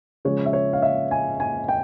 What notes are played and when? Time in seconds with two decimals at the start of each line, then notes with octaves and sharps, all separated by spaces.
0.25 C#3 F3 G#3 C#5
0.46 E5
0.53 C#5
0.73 F5
0.82 E5
1.11 G#5
1.40 G#5
1.68 G5